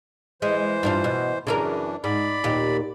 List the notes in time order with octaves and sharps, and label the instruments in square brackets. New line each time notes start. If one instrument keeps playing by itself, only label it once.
[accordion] E3 C5 [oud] G#3
[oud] G2 D4 F4
B2
[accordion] F#2 E3 D4 [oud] C#3 E4 A#4
[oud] G#2 [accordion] D5 B5
[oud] D#2 A#2 G4